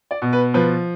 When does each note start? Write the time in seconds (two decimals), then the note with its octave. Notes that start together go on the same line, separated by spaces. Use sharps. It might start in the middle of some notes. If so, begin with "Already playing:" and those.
0.11 D5
0.22 B2
0.33 B4
0.54 F3 B4